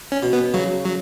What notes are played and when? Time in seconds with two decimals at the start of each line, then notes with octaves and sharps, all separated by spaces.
0.12 C#4
0.23 B2
0.33 B3
0.54 C#3 F#3
0.84 F#3